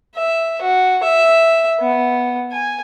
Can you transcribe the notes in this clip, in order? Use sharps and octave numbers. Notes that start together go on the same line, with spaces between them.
E5
F#4
E5
B3
G#5